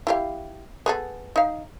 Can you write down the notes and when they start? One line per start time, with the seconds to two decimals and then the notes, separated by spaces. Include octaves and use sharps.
0.07 E4 G4 F5
0.86 B3 G#4 A4
1.36 D#4 F5